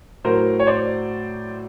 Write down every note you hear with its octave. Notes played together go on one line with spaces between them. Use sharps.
A2 F#3 A#4 C5
C#5
C5 D5